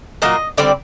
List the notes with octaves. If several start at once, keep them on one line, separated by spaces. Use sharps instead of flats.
A#2 F#3 A#3 D#5
D3 G3 C4 D5